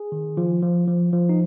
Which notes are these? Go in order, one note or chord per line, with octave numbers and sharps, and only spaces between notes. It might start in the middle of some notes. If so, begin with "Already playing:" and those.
Already playing: G#4
D#3
F3 F4
F3
F3
F3
D#4